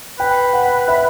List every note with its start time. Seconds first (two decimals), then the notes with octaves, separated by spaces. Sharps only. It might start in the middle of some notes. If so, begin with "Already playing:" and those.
0.19 B4 G5
0.54 F#5
0.88 E5